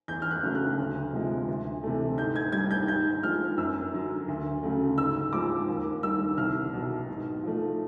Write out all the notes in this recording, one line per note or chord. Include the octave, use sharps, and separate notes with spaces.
E2 G6
F6
F#6
C#3 F#3 A3
F#6
D2
C3 F3 G#3
D2
C3 E3 A3
G#2 G6
G#6
D#3 G3 G#6
G6
G#2 G6
F3 G#3 F6
F#2 E6
D3 F#3
D2
C#3 F#3 A3
G#2 E6
F3 G#3 D6
D#2
D#3 G3 E6
C2 F6
B2 F#3
G#2
F3 A3